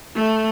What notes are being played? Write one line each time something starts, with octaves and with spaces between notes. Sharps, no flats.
A3